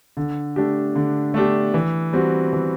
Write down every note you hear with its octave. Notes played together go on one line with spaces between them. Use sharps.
D3
A3 D4 G4
D3
A3 D4 G4
E3
G3 C4 F#4
E3